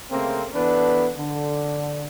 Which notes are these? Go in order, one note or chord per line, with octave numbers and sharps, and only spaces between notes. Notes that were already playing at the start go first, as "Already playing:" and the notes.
C#3 A3 A#3 C4
E3 B3 D4 A4 B4
D3